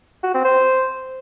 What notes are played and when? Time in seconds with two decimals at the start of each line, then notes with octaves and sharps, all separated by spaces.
0.24 F#4
0.34 C4
0.45 C5